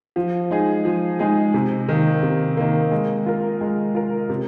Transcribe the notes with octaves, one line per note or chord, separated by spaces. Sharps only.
F3
G#3 D#4 G#4
F3
G#3 D#4 G#4
C3
D#3 A#3
C3
D#3 A#3
G#3
F4 A#4
G#3
F4 A#4
C3